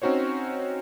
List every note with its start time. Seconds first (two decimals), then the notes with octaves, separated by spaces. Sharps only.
0.02 C4 C#4 D#4 F#4 C5 C#5